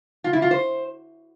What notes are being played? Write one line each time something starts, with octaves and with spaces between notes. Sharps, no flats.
F4
E4
F4
C5